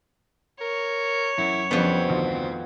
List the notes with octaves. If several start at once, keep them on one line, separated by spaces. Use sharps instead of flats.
A#4 C#5
F#2 E4
F2 C#3 G3 B3 C4 D4
G#1 D2 F#4